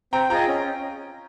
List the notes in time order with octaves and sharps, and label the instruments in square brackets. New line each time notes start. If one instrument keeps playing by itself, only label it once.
[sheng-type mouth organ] C4 [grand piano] G5 A#5
[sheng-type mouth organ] F4 G#4 D#5 [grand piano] G5 A#5
[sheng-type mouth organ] C#4